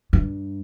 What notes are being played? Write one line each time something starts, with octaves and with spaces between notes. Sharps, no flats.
G2